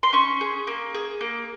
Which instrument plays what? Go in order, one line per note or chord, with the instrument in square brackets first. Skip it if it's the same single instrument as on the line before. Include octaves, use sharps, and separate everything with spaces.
[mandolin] C6
C#4 C#6
G#4
A#3
G#4
A#3